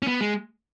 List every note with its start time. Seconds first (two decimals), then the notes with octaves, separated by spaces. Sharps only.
0.03 C#4
0.07 B3
0.21 G#3